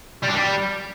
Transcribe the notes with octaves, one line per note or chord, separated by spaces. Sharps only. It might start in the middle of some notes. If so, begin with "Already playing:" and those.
G3
D4
G3